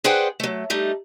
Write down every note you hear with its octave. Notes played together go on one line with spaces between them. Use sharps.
G#4 B4 C5 D5 F#5 G5
F#3 A3
G3 A3 D#4